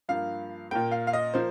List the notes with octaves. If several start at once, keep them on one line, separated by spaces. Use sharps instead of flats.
G2 F3 A#3 F5
A#2 A#3 G5
F5
F5
D#5
F3 A#3 C5